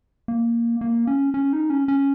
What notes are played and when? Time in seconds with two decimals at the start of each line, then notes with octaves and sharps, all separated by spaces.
0.28 A#3
0.81 A#3
1.07 C#4
1.34 C#4
1.53 D#4
1.70 C#4
1.88 C#4